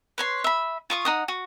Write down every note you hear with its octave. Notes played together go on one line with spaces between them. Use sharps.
B4 C#5 C6
E5 B5
F4 C#6 D#6
D#4 F#5 D#6
F#4